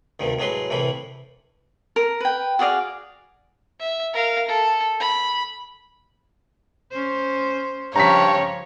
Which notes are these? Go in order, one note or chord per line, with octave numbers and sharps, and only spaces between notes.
D2 G2 C3 D#3
A2 F#3 G#3 B4 C6
C2 A2 C3 E3 B5
A#4
B4 G5
F#4 G#4 D5 F5
E5
A#4 F5
A4
B5
C#4 C5
G2 C#3 F3 C#5 A#5 B6